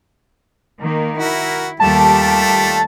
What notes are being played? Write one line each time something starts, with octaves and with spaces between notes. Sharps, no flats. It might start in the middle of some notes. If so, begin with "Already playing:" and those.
D#3 A#3
E4 F#4 A#4
D#2 G3 A3 F4 G4 A5